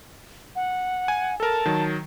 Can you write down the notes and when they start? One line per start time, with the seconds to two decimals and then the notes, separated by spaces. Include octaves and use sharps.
0.56 F#5
1.08 G#5
1.40 A4 A#4 A5
1.66 D#3 F#3